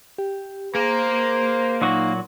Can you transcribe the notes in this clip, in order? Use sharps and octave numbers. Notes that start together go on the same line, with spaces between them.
G4
A#3 G#4 A#4 C5
A#2 F#3 D#4 F#4